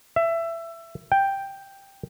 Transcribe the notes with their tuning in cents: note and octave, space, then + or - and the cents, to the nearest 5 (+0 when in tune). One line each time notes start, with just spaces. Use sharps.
E5 +20
G5 +5